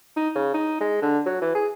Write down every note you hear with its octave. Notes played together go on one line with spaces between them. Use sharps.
D#4
C#3
D#4
G#3
D3
F#3
E3
G#4